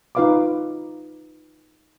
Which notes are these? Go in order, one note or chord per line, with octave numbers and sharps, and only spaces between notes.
D#4 F4 B4 F5 B5 D6